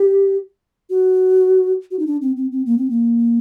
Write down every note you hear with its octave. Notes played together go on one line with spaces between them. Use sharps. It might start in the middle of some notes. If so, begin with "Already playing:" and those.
Already playing: G4
F#4
F#4
D#4
D4
C4
C4
C4
A#3
C4
A#3